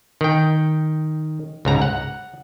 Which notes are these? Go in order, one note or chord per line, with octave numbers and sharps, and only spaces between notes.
D#3 G5
C#2 G#2 A#5
F#5